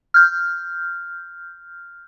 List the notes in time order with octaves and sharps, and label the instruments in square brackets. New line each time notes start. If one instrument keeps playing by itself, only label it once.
[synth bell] F6 G6